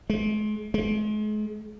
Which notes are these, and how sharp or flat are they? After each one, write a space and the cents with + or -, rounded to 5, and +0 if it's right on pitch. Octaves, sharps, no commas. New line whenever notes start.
G#3 +40
G#3 +40